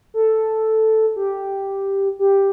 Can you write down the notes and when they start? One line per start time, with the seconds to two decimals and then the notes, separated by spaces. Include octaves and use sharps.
0.14 A4
1.16 G4
2.19 G4